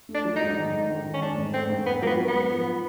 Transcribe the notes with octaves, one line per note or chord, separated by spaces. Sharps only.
A3
D4
F#3
D#4
G#2
D#3
G#2
D#3
D#3
C#4
G#2 D4
G#2
A3 C4
G#2
G#2 B3
F#3 A#3 B3
F#3
B3
G#2
F3